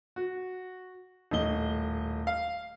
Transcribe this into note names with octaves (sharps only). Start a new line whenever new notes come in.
F#4
D#1 A2 D#5 G7
F5